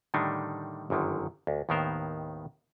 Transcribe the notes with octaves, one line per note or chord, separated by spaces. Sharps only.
A2 D3 D#3 G3 D4 D#4
G1 F#2 D3 D#3
D2
D#2 A2 D#3 B3 A#4 C5